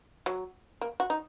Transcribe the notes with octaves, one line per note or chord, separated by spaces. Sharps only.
F#3
A#3
F#4
D#4